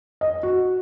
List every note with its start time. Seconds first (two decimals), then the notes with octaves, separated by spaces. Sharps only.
0.21 D#5
0.43 F#4